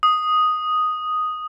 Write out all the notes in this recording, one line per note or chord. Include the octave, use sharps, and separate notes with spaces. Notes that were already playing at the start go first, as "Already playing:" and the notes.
D#6